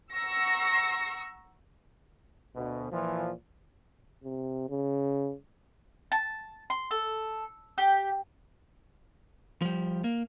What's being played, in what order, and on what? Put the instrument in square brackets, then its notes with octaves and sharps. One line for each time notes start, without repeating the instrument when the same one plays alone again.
[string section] F#5 A#5 C#6 E6 A#6 C#7
[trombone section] D2 B2
A#2 E3 F3
[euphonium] C3
C#3
[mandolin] A5
C6
A4
G4
[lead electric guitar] F3 G3
A#3